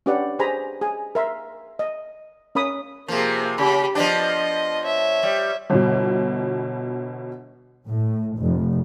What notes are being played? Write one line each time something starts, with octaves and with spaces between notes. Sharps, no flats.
C#4 D4 G4 B4 D5 F#5
G4 G#4 C5 G#5 A#5 B5
G#4 G#5
A#4 E5 C6
D#5
C#4 A#4 B5 D#6
C3 F3 A#3 G#4
C#3 G4 B5
F3 B3 D4 D#5
C#5 E5
G3
G1 B2
A2
F1